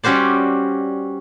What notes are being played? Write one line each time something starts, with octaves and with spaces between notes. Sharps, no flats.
G3 C#4 F#4 C5 D5